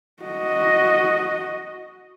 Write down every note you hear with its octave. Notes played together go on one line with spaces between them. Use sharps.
F#4 D#5